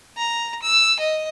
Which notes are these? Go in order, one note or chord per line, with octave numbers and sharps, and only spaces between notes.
A#5
E6
D#5